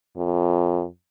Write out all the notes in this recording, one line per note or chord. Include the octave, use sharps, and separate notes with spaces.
F2